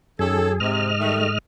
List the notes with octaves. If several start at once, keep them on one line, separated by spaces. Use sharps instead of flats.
F#2 D#3 C#4 G#4 A4
G#2 C3 D#5 F6
D#3 G3 A3